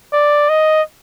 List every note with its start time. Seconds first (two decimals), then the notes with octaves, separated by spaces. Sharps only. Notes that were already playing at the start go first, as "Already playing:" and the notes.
0.13 D5
0.49 D#5